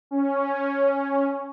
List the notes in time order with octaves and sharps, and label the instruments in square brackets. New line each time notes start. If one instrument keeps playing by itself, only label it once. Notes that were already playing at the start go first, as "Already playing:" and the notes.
[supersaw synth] C#4